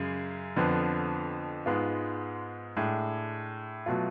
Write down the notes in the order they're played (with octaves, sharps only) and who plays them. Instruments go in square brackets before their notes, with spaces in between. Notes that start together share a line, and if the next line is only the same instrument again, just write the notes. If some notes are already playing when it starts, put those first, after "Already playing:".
Already playing: [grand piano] F#2 C#3 G#3
F2 D3 F3 B3
G#2 G#3 B3 F4
A2 G#3 D4
B2 F#3 A3 F4